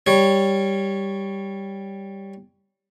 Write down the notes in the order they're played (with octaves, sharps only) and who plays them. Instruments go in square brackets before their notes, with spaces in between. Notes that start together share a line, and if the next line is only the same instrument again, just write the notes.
[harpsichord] G3 C#5